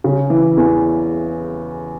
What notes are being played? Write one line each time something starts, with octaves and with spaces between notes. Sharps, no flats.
C#3
E3
E2